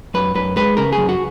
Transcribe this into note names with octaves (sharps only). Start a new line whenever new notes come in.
F#2 B4
F#2 B4
G#3 B4
C#3 A#4
F#2 G#4
F#4